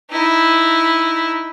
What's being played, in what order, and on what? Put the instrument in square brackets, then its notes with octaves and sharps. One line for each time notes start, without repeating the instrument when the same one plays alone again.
[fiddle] D#4 E4